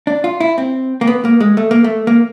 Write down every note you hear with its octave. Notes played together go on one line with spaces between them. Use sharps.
D4
F4
E4
C4
A#3
B3
A#3
G#3
A3
A#3
A3
A#3